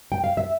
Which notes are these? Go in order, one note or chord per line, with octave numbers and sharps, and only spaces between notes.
G5
F5
E5